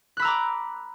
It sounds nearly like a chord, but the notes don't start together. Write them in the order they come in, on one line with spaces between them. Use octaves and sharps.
F#6 B5 E6 A#5 D6